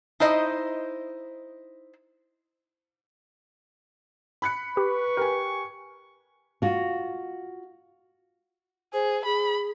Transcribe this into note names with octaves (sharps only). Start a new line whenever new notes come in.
D#4 E4 C5 D#5
B5 F#6 C#7
G4 B4 C#6
G4 A#4 G#5
F4 F#4
G#4 C5
G#4 B5